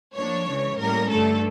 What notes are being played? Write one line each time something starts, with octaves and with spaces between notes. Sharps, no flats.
A2 F3 A#3 D4 C#5
C#2 C#3 E3
A2 G3 A#3 C#4 A#4
G2 D3 A3 A4